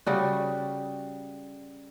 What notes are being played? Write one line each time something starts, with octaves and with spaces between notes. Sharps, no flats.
C#3 G3 F#4